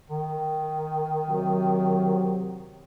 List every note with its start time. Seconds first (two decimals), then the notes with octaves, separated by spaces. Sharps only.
0.10 D#3
1.28 C3 F#3